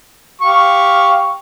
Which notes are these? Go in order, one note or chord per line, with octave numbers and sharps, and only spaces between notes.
G4 F5 C#6